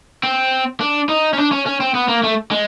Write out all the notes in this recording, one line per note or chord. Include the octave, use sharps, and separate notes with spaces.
C4
D4
D#4
C#4
D4
C#4
C#4
C4
B3
A#3
A3
G#3